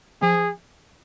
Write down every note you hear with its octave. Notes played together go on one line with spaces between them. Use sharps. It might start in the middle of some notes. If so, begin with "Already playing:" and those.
F3 G#4